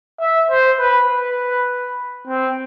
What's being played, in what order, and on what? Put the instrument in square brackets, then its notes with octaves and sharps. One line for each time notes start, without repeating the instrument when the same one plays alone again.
[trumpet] E5
C5
B4
B4
C4